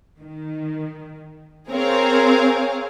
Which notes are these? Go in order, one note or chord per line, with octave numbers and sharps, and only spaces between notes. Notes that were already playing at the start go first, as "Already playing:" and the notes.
D#3
C4 G#4 A#4 C#5 F5